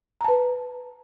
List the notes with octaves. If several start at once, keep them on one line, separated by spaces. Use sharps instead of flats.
B4 A5 A#5